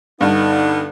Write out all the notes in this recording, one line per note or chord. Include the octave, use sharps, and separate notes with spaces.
G2 D3 B3 D#4